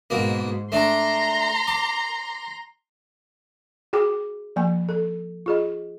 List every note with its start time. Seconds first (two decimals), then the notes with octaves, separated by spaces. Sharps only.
0.10 G#2 B2 A#3
0.72 A3 D4 A#5 C6
1.67 D6
3.93 F#4 G#4 G5 D6
4.56 F3 A#3 G#5
4.89 A4
5.46 F4 G#4 D#5